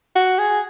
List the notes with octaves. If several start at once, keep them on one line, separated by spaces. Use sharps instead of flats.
F#4
G#4